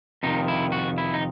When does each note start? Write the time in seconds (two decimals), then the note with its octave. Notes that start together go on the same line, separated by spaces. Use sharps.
0.23 F2 C3 D#3 D#4
0.48 E4
0.72 F#4
0.98 E4
1.14 D#4